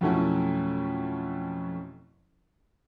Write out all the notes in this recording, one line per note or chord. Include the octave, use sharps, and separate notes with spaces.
F2 B2 F#3 A3 C#4 E4